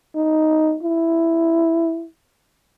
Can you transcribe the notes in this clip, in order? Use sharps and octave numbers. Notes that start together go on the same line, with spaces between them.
D#4
E4